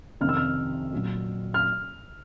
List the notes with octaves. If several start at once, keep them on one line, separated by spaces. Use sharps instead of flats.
F2 C3 D#3 F6
E6
F6
A#2 F#3
F6